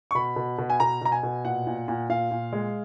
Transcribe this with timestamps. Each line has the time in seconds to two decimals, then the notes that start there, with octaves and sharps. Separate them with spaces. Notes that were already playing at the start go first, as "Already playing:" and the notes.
0.11 C#6
0.15 B2 B5
0.36 B2
0.58 B2
0.70 G#5
0.80 B2 A#5
1.01 B2 A#5
1.12 G#5
1.23 B2
1.45 A#2 F#5
1.67 A#2
1.88 A#2
2.09 A#2 F5
2.31 A#2
2.53 G#3